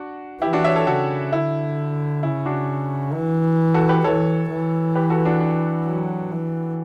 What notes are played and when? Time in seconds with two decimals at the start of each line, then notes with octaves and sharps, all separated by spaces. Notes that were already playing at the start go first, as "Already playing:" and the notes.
Already playing: D4 F#4
0.41 E3 E4 G4
0.53 D4 F#4
0.64 C#5 E5
0.75 A4 C#5
0.86 C#3 F#4 A4
1.32 D3 E4
2.23 C#3 E4
2.46 D4 F#4
3.14 E3
3.74 F#4 A4
3.89 G4 B4
4.04 E3 A4 C#5
4.50 E3
4.95 G4 B4
5.10 F#4 A4
5.25 D4 F#4
5.40 D4
5.86 F#3
6.31 E3